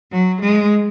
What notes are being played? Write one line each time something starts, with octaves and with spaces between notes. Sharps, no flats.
F#3
G#3